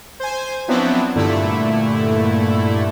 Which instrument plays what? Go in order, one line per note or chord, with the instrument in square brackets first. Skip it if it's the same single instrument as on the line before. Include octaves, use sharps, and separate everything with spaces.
[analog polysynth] C5 G#5
F3 F#3 B3 C4 D4 E4
G2 A#2 D3 A3 E4